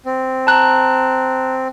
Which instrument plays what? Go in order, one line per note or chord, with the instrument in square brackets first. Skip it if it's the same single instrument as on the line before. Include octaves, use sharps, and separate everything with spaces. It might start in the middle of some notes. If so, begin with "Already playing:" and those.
[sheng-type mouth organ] C4
[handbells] A5 A#5 F#6